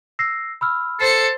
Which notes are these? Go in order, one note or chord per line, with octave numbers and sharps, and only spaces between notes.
E6 A#6 C7
B5 E6 F6
A4 C5 C7 C#7